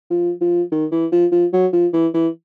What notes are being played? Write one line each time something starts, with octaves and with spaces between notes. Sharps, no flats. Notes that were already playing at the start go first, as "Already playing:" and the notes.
F3
F3
D#3
E3
F3
F3
F#3
F3
E3
E3